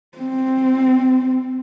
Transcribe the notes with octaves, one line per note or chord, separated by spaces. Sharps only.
C4